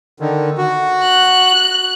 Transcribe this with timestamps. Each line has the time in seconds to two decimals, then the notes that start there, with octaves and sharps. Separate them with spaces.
0.20 D3 D#3
0.58 F#4
1.03 F#6